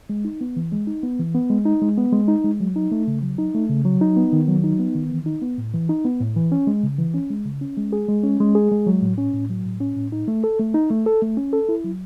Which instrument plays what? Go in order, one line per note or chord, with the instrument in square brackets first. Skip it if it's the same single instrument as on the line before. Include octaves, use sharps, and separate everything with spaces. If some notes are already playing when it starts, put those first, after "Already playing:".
[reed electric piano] G#3
D#4
B3
E3
G#3
D#4
B3
E3
B3
G#3
D#4
G#3
B3
G#3
D#4
G#3
F#3
D#4
A3
C#3
F#3
D#4
A3
C#3
F#3
D#4
B3
D#3
F#3
D#4
B3
D#3
E3
D#4
B3
A2
E3
D#4
B3
A2
E3
C#4
G#3
C#3
E3
C#4
G#3
C#3
C#4
G#3
G#4
G#3
C#4
G#3
G#4
G#3
F#3
A2
C#4
A2
F#3
A2
C#4
A2
D#4
A3
A4
A3
D#4
A3
A4
A3
C#4
A4
E4
F#3